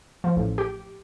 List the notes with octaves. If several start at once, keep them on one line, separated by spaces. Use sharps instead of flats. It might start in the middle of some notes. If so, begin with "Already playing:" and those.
F3
A1
G4